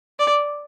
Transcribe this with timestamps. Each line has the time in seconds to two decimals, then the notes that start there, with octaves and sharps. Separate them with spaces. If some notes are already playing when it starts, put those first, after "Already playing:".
0.19 D5